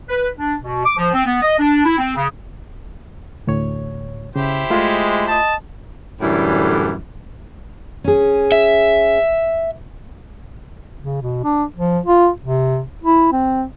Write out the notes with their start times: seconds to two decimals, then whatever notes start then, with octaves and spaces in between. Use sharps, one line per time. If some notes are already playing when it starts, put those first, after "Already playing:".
0.09 B4
0.38 D4
0.62 B2
0.85 D6
0.97 F3
1.12 C4
1.25 B3
1.42 D#5
1.58 D4
1.85 E4
1.98 C4
2.15 C#3
3.47 D2 A2 C#5
4.36 C#3 E4 G4 C5
4.70 G#3 A3 F4
5.28 D#5 A5
6.20 F#2 A2 D3 E3 G3
8.04 C#4 G#4
8.52 E5
11.02 C#3
11.22 B2
11.44 D4
11.76 F3
12.05 F4
12.41 C3
13.03 E4
13.32 C4